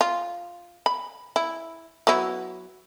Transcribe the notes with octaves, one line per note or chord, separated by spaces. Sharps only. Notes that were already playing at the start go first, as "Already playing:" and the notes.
F4
B5
E4
F#3 B3 E4